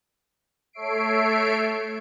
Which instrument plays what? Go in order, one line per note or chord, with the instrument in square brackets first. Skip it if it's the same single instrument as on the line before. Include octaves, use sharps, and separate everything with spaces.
[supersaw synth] A3 A4 C#5 E5 C7 D7